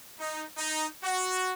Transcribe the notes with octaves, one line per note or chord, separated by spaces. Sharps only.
D#4
D#4
F#4